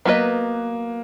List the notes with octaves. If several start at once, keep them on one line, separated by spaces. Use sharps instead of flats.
F#3 A#3 B3 F#4 B4 D#5